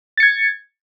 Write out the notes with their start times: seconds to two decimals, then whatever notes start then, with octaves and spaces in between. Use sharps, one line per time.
0.17 A6
0.20 C#7
0.23 G#6